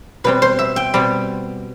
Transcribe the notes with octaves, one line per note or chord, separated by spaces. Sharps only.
B2 G3 C4 B4
C5
E5
G5
B2 G3 C4 B5